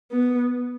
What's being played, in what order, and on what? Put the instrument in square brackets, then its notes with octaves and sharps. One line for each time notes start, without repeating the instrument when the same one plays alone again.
[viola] B3